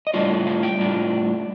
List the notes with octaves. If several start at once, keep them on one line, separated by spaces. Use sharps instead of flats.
D#5
A2 G3 D4 F4 D5
F5
G5
A2 G3 D4 F4